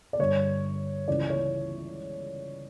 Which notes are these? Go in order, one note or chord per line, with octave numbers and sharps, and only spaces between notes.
D5
G2 D3 C#5
C#2 C#3 E3 D5
C#5